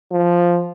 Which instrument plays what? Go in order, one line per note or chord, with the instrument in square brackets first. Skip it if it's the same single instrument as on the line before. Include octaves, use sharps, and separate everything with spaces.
[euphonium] F3